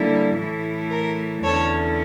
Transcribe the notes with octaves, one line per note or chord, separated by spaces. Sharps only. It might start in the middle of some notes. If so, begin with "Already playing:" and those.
Already playing: D3 G3 A#3 E4
A2 E3 A3 E4
A#4
E2 D3 A3 C#4 E4 A4 C#5